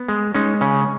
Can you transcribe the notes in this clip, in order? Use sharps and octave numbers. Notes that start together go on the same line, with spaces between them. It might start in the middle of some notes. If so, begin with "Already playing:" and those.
Already playing: B3
G#3
G#3 C#4 D#4
C#3 C#4